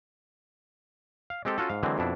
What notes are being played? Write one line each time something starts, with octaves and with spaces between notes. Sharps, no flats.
F5
G#3 C4 G4 A4
C#4 F4 F#4 A4
G#2 F5
D3 E3 F#3 G#3 C4
F2 B2 D4 E4